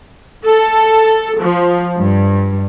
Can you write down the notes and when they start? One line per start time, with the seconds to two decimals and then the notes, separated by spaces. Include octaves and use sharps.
0.44 A4
1.40 F3
1.97 G2